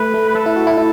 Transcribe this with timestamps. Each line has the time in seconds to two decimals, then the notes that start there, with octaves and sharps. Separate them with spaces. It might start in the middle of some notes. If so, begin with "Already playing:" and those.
Already playing: A3 B4
0.14 A3
0.29 B4
0.35 A3 A4
0.46 E4
0.56 F#4
0.67 E4
0.77 E4